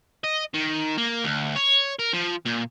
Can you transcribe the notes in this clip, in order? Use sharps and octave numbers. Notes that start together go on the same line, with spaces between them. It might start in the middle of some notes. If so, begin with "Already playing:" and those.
D#5
D#3
A#3
D2
C#5
A#4
F3
A#2